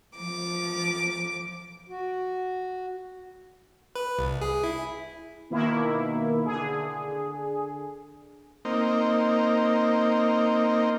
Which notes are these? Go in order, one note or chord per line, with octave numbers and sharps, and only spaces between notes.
F3 D6
F#4
B4
C2
G#4
E4
B2 D#3 A#3 E4
D3 G#4
A#3 C4 D#4